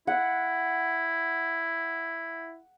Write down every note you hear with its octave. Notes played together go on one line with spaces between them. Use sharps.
E4 F#5